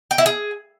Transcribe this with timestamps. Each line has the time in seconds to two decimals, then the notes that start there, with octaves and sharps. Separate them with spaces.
0.11 G5
0.18 E4
0.26 G#4